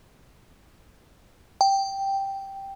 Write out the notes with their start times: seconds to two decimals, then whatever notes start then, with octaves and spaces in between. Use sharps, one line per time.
1.61 G5